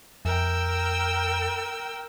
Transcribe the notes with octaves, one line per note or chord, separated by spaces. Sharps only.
F2 A#4 G5 E6